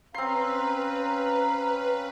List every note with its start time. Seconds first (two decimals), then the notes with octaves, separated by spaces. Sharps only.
0.14 C4 C#4 B4 F5 A#5 C6